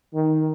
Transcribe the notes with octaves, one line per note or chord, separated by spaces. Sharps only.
D#3